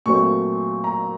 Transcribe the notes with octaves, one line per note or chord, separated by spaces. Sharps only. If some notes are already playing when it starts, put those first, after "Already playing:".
A#2 F#3 A3 C4 C#6
A#5